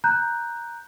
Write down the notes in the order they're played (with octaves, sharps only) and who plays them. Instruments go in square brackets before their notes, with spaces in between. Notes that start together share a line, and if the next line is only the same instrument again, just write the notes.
[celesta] A#5 F#6 G6